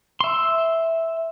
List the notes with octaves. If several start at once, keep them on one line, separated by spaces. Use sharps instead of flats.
E5 C6